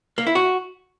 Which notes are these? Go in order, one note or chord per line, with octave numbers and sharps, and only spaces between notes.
A#3
E4
F#4